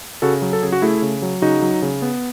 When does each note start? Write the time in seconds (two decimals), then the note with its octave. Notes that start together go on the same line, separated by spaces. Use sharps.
0.22 C#3 F#4 A4
0.42 F#3
0.53 A4
0.62 C#3 G#4
0.72 F#4
0.82 A3 E4 G#4
1.02 C#3
1.22 F#3
1.42 C#3 D#4 F#4
1.62 F#3
1.82 C#3
2.02 B3